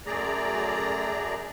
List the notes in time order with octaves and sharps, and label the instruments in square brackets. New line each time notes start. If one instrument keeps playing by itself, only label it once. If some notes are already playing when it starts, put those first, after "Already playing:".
[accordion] F#2 A3 G#4 D5 A#5